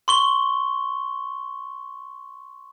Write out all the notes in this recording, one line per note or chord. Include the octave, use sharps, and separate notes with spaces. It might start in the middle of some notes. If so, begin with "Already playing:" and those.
C6 C#6 G7